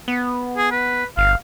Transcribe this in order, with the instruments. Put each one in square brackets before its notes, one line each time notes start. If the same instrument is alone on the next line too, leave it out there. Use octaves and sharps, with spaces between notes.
[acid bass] B3
[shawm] G#4
B4
[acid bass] G1 [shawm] F5